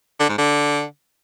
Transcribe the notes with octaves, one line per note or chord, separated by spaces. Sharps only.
D3
G#2
D3